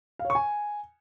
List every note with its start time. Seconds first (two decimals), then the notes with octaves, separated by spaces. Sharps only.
0.19 F5
0.25 C#5
0.30 C#6
0.35 G#5